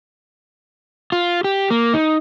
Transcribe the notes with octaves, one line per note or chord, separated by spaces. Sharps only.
F4
G4
A#3
D#4